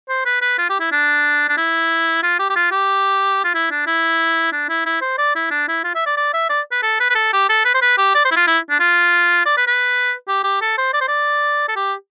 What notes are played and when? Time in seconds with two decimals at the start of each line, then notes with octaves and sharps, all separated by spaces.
0.09 C5
0.26 B4
0.42 B4
0.58 F4
0.70 G4
0.80 E4
0.92 D4
1.49 D4
1.57 E4
2.23 F4
2.39 G4
2.50 G4
2.56 F4
2.72 G4
3.44 F4
3.54 E4
3.71 D4
3.87 E4
4.52 D4
4.69 E4
4.86 E4
5.02 C5
5.18 D5
5.35 E4
5.51 D4
5.68 E4
5.84 F4
5.95 E5
6.06 D5
6.17 D5
6.33 E5
6.49 D5
6.72 B4
6.82 A4
7.00 B4
7.10 B4
7.15 A4
7.33 G4
7.49 A4
7.65 B4
7.74 C5
7.82 B4
7.98 G4
8.15 D5
8.25 C5
8.31 E4
8.36 F4
8.47 E4
8.70 D4
8.80 F4
9.46 D5
9.57 B4
9.67 B4
10.28 G4
10.44 G4
10.61 A4
10.78 C5
10.94 D5
11.01 C5
11.08 D5
11.68 A4
11.76 G4